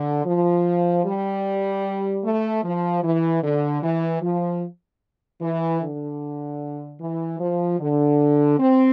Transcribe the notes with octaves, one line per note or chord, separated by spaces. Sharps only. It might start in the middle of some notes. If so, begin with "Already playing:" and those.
Already playing: D3
F3
G3
A3
F3
E3
D3
E3
F3
E3
D3
E3
F3
D3
C4